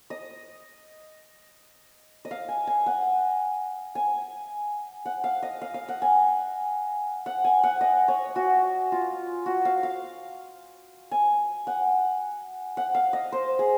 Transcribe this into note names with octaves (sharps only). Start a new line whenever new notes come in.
D#5
D#5
F5
G#5
G#5
F#5
G#5
F#5
F5
D#5
F5
F5
F#5
G#5
F#5
G#5
F#5
D#5
C#5
F#4
F4
F#4
F5
F5
G#5
F#5
F#5
F5
D#5
C5
G#4